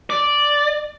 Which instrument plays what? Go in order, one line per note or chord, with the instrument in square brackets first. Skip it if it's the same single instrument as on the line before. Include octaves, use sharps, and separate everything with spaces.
[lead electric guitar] D5